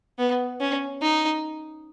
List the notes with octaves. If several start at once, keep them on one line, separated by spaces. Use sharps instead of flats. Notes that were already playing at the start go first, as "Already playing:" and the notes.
B3
C#4
D#4